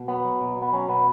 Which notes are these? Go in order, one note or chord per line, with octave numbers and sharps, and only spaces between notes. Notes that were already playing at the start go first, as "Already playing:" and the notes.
Already playing: B2
F#3 B3
F#3
B2
B2
B3
F#3 C#4
B2 B3